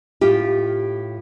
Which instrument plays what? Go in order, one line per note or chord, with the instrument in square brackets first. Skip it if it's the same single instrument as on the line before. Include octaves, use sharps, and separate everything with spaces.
[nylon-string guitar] A2 F4 G4